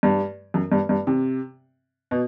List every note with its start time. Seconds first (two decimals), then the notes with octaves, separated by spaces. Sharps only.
0.03 G2
0.54 F#2
0.72 G2
0.89 G2
1.07 C3
2.11 B2